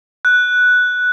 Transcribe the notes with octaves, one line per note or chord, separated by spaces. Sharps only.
F#6